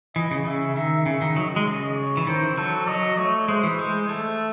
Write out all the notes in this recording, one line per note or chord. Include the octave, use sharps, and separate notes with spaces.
E3 D#5
C#3
C#3 E5
D#3 E5
C#3
D#3
F#3 D#5
G#3
C#3 D#5
C#5
E3
D#3 C5
E3
F#3 A4
F#3 D#5
A3 C#5
G#3 C5
E3
G#3
A3 A4